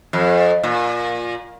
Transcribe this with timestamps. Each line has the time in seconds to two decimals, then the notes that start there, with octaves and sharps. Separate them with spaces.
0.13 F2
0.63 A#2